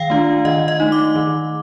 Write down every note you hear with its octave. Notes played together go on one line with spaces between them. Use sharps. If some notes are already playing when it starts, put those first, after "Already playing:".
Already playing: D#3 F5 G5
A3 D4 F4
D#3 D#5
D#5
A3 D#4
D6
D#3